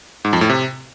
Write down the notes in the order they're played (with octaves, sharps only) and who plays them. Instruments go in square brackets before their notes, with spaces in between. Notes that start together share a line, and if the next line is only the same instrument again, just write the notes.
[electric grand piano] G#2
F2
A2
C3